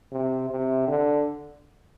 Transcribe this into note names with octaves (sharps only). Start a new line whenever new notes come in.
C3
C3
D3